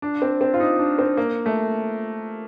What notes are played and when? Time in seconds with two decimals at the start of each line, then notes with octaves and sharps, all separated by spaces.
0.02 D4
0.22 C4
0.41 C4
0.54 F4
0.60 D#4
0.79 D4
0.99 C4
1.17 A#3
1.46 A3